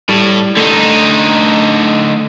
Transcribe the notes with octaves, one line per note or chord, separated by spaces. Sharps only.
A2 G3
D3 A3 D#4